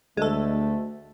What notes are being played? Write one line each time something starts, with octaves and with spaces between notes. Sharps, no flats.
D2 G#3 A3 A4